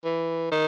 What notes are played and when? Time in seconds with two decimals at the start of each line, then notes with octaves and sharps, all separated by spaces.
0.05 E3
0.52 D#3